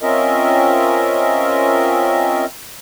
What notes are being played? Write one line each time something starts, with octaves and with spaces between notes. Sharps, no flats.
C4 C#4 F4 A#4 D#5 E5